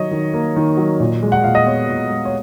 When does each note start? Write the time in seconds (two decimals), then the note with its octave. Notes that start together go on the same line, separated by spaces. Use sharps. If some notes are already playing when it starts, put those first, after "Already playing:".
Already playing: D#3 F#3 C#5 D#5
0.11 D#3
0.34 A#3
0.56 D#3
0.77 F#3
1.00 A#2
1.23 G#3
1.32 F#5
1.44 A#2 F5
1.55 D#5
1.66 B3 C#5
1.89 A#2
2.10 G#3
2.25 C#5